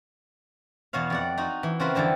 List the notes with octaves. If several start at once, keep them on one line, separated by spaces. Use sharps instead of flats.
E2 B2 F#4 C#5 F5
F2 D5 F#5
D#4 F4 F#4
E3
C#3 C4 F4 F#4 A#4 B4
F2 D3 E3 G3 A4